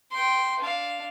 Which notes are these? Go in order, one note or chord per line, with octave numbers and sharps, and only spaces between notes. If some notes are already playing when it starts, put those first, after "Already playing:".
G5 C6
D4 F5